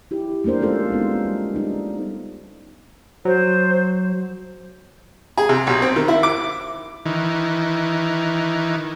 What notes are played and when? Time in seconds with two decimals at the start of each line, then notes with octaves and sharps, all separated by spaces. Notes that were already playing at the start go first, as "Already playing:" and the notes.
0.11 E4 G4
0.44 A3 A#3 D4 A#4 C5
0.60 G#3 A3 C#4 F4 A4 C5
0.90 G#3 B3 D#4
1.25 G3
1.55 G3 D4 D#4
3.25 F#3 C5
5.38 G#4
5.49 C3
5.67 B1
5.82 C4
5.96 D#3
6.08 E4
6.23 D6
7.05 D#3 E3